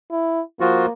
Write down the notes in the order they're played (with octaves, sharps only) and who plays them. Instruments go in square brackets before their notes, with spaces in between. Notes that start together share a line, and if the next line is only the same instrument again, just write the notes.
[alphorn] E4
[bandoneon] F3 F4 F#4 [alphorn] A#3